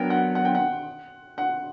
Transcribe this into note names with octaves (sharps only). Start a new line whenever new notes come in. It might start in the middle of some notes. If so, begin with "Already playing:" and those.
Already playing: F#3 B3 D4 A#4 G5
F#5
F#5
G5
F#5
F#5